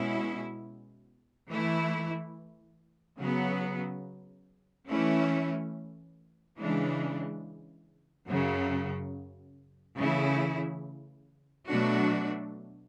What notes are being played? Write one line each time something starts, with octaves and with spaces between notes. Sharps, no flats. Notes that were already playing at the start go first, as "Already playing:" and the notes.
Already playing: B2 G#3 C#4 E4
E3 A3 E4
C#3 F#3 B3
E3 A3 C#4 E4
C#3 E3 G#3 D4
F#2 C#3 F#3
C#3 E3 A3 E4
B2 F#3 A3 D4 F#4